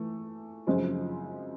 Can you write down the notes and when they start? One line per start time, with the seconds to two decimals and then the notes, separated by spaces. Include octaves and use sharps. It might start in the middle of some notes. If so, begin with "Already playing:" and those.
Already playing: E3 A3
0.67 F#2 C#3 F3 G#3 C4